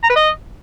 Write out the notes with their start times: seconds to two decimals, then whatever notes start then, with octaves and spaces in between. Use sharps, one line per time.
0.03 A#5
0.10 B4
0.16 D#5